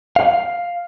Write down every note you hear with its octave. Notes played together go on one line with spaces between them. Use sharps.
F5